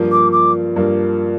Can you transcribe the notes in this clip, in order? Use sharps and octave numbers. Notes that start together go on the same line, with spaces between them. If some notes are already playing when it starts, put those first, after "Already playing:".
Already playing: G2 F3 A#3
D6
D6
G2 F3 A#3